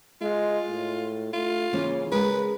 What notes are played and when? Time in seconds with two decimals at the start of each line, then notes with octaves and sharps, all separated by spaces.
0.22 G#3 F4
0.69 A2
1.34 A3 F4
1.73 C#3 E3 A#3 C#4
2.12 G#3 G#4 A#4 B4